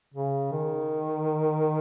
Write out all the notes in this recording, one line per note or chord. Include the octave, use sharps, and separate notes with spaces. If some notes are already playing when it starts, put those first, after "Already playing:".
C#3
D#3